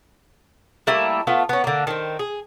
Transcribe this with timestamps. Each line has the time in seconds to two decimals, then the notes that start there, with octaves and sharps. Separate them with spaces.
0.87 G3 A3 A#3 E4
1.27 A3 B3 F4
1.49 B3 C#4
1.64 D3 A#3
1.87 D#3 C4
2.19 G#4